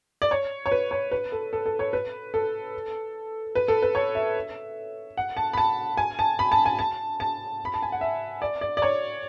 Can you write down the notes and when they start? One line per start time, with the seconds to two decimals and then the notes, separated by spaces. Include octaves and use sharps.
0.22 D5
0.31 C#5
0.66 C#5
0.71 B4
0.91 C#5
1.12 B4
1.32 A4
1.53 A4
1.66 A4
1.79 C#5
1.93 B4
2.34 A4
3.55 B4
3.68 A4
3.82 B4
3.95 C#5
4.15 E5
5.17 F#5
5.37 A5
5.53 B5
5.57 A5
5.97 G#5
6.19 A5
6.39 B5
6.52 A5
6.66 G#5
6.79 A5
7.20 A5
7.65 B5
7.74 A5
7.83 G#5
7.92 F#5
8.01 E5
8.42 D5
8.61 D5
8.77 D5
8.82 C#5